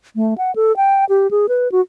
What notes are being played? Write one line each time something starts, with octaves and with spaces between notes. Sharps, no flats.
A3
F#5
A4
G5
G4
G#4
B4
F#4